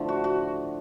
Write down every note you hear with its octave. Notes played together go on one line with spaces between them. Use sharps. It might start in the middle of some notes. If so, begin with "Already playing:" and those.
Already playing: A2 D3 F3 A3
F#4
F#4